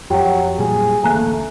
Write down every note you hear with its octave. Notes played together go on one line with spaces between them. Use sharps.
F2 F#3 F#4 G4 G5
A#2 F#3 G3 G#4
A1 D2 A3 A#3 G#5 A#5 F#6